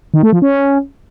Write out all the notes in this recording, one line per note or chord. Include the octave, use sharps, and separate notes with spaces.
D#3
A3
F3
C#4